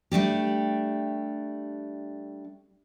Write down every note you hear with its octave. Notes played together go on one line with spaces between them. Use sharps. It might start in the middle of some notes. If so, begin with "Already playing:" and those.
G3 A3 D4 G4